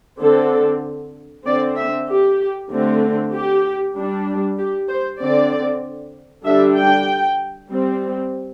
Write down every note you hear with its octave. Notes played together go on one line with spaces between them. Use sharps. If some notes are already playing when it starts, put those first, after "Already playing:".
D3 C4 A4
D3 C4 D5
E5
G4
D3 A3 C4
G4
G3 D4
G4
C5
D3 C4 D5
D3 G3 D4 E5
G5
G3 C4